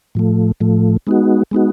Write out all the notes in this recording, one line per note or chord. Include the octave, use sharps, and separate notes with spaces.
A2 F3 A3
A2 F3 A3
G#3 B3 D#4 F#4
G#3 B3 D#4 F#4